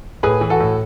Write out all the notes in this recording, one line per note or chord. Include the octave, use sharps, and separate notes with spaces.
A2 G#4 B4
E3
F#4 A4
A2